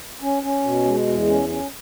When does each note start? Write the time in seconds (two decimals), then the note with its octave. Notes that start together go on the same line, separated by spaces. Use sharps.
0.22 C#4
0.43 C#4
0.63 B2
0.85 G#3
1.07 E2
1.27 C#4
1.49 C#4